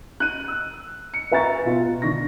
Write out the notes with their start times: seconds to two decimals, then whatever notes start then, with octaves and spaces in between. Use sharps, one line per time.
0.20 F#6 D#7
0.48 E6
1.14 C#7
1.32 B4 E5 G#5 A#5 C#6 A6
1.65 B2 F4
2.02 D3 D4 C#6 A#6